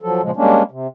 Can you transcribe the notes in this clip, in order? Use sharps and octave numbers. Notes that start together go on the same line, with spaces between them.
F3 F#3 A4
A#2 C#3 F3 G#3
G3 G#3 A#3 C#4 D4
C3